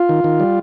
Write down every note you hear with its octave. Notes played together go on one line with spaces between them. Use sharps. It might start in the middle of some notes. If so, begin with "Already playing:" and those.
Already playing: F4
D#3
D#3
G3